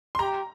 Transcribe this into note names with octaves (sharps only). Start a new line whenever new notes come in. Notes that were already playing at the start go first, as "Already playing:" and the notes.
C6
G4 A#5